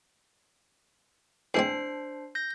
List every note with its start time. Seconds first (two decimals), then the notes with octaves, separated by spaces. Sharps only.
1.54 E2 G#3 C4 D4 C5 C7
2.35 G6 A#6